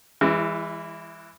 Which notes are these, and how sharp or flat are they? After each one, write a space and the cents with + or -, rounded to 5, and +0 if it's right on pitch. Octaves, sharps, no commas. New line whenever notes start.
E3 +0 G#3 -35 E4 +35